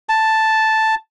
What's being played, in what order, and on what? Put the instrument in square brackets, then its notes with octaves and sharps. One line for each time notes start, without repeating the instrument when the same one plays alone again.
[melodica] A5